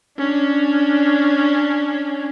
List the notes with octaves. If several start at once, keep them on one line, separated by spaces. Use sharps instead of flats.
C#4 D4